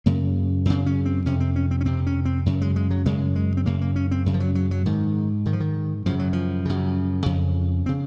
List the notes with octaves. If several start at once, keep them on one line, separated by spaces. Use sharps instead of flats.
F#2 C#3 A#3
F#2 C#3 C4
C#4
C4
F2 C3 C#4
C4
C#4
C4
C#4
F2 C3 C4
C#4
C4
F#2 C#3
G#3
G#3
F#3
F#2 C#3 G#3
G#3
C4
F#2 C#3 A#3
A#3
C#4
C4
F#2 C#3
F3
F#3
F#3
F#3
G#2 D#3
G#2 D#3
F3
D#3
F#2 C#3 F3
F#3
F3
F#2 C#3
F2 C#3
C4
C#3